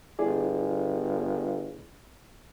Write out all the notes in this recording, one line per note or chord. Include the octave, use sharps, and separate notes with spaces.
G1 E4 G#4 D5